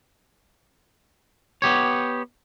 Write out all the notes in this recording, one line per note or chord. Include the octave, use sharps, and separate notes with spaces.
B3 G4 C#5